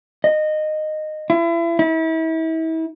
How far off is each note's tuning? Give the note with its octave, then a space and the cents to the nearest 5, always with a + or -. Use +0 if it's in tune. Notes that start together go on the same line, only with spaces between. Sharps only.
D#5 -15
E4 +35
E4 -35